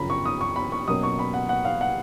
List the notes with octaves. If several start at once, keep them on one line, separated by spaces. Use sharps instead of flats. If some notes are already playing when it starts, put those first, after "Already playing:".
Already playing: F#2 C#3 F3 A#5 B5
C#6
D#6
C#6
B5
C#6
B2 F#3 A#3 C#4 D#6
C#6
B5
F#5
F#5
F5
F#5